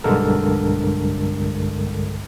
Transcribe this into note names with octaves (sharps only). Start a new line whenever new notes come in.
B1 G2 D3 G#3 A4 A#4